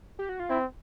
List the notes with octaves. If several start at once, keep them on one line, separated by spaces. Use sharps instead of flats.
G4
F#4
F4
C4 E4